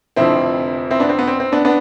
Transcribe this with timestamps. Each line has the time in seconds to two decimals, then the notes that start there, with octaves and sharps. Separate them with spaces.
0.16 F1 F2 D3 F3 C4 E4
0.90 C4 E4
1.00 B3 D4
1.09 C4
1.19 B3
1.27 C4
1.40 C4
1.52 B3 D4
1.65 B3 D4